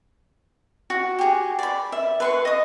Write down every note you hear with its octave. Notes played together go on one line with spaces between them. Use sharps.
F#4
G4 G#4
D5 B5
E5
B4 C6 C#6
D#5 D#6